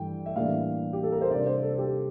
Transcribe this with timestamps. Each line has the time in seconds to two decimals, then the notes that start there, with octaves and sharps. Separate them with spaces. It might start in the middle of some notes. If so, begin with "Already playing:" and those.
Already playing: G2 E3 A3 G5
0.26 E5
0.36 A2 E3 G3 A#3 D4 F5
0.93 G4
1.03 A4
1.12 A#4
1.21 C5
1.30 C3 G3 D4 D5
1.46 C5
1.62 A4
1.73 A4
1.78 G4